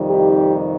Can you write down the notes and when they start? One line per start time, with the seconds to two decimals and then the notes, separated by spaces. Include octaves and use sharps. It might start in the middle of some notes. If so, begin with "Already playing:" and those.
Already playing: F2 C3 D#3 G3
0.09 D#4 G4